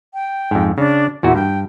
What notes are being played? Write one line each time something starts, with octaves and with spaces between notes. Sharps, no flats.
G5
F2 G#2
C#3 D4
E2 A#2 E4 F#4
G2 G5